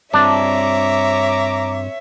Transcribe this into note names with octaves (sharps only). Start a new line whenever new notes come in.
G2 C4 D4 C#5 E5 A#5 D6